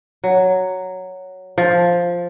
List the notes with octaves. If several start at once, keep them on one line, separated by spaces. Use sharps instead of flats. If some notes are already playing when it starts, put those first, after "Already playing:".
F#3
F3